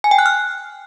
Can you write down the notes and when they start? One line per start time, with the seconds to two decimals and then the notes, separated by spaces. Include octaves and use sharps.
0.04 G#5
0.11 G5
0.19 F#6
0.26 F6